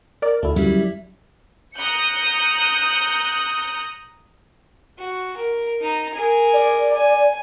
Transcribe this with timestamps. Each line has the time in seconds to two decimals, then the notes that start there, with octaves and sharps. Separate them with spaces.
0.22 A#4 D5
0.43 D2 A3 E4
0.56 F#2 G3 E4
1.76 A#5 D#6 F#6 G6 C#7
4.99 F#4
5.37 A#4
5.82 D#4 A#5
6.14 G#4 A#4
6.54 D5
6.93 G#5